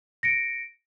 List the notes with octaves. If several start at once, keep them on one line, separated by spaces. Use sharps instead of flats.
A#6 C#7 D7